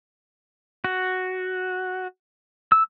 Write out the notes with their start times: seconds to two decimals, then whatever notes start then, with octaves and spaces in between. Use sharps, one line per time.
0.84 F#4
2.72 E6